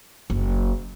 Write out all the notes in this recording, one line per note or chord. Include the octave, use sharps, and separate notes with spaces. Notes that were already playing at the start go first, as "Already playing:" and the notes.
F#1